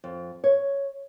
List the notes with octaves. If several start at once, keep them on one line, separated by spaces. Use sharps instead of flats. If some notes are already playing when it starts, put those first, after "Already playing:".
F2
C#5